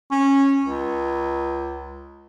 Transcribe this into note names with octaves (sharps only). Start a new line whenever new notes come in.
C#4
C#2